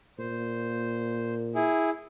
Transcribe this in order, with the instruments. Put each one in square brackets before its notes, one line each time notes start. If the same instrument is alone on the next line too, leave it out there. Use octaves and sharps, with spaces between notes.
[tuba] A#2 [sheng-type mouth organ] C5
[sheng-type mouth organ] E4 G#4